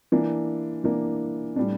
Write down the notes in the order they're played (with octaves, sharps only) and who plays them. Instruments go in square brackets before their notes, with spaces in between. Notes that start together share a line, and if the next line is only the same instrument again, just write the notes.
[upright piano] E3 A#3 D4
E3 A#3 D4
A2 G3 D4